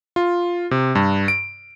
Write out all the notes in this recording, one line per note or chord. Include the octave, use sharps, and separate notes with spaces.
F4
C3
G2
D7